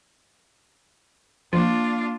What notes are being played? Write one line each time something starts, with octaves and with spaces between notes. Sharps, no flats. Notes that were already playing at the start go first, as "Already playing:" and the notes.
F3 A#3 D4 F4